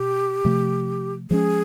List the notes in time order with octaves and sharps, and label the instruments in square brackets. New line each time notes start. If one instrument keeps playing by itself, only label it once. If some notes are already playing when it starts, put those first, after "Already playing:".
Already playing: [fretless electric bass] B2 [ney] G4
[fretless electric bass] C3 F3 A3
[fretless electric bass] F3 G#3 C#4 [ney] G#4